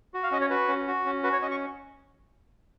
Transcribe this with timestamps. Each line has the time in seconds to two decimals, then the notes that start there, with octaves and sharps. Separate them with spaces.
0.14 F#4
0.23 F5
0.31 C#4 D#5
0.41 C#5
0.50 F#4 B4
0.68 C#4
0.87 F#4
1.06 C#4
1.23 F#4 B4
1.33 C#5
1.42 C#4 D#5
1.51 C#6